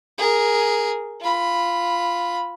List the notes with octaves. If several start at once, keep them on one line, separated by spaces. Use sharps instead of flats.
G#4 A#4
F4 B5